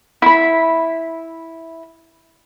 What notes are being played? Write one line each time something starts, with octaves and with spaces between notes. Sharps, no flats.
E4 B5